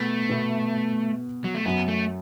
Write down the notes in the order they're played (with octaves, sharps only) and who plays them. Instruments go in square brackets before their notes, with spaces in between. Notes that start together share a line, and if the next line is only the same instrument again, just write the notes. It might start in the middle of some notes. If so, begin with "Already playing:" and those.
Already playing: [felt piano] B2 B3 [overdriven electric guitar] A3
[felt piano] B2 B3
[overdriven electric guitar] F#3
A3
[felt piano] F#2 F#3 [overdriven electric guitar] B3
[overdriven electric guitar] A3